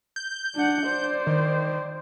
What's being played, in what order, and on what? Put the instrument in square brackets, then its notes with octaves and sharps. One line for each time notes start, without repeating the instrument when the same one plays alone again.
[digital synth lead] G6
[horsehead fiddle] D4 F#5
C5 D5
[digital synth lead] D#3